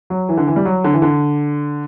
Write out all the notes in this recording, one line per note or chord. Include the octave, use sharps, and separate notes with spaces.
F#3
E3
D3
E3
G3
F#3
D3
E3
D3